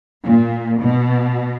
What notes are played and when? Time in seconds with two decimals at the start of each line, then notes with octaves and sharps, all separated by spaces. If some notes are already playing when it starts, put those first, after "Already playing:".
0.23 A#2
0.80 B2